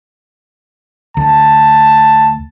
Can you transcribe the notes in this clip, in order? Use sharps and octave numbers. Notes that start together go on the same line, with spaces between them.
D2 A5